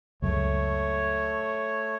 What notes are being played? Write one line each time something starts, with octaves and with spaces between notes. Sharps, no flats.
C#2 F#2 A3 C#5